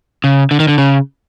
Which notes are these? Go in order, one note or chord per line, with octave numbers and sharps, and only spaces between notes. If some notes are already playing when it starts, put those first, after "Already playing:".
C#3
D3
D#3
D3
C#3